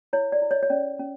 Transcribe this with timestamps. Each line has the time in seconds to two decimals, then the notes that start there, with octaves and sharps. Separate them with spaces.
0.13 E4 C#5
0.32 D5
0.42 E4
0.51 C#5 D#5
0.63 C#5
0.70 C#4 D5
0.99 C#4